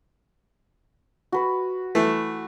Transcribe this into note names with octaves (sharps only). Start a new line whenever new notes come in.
F#4 B4
E3 A3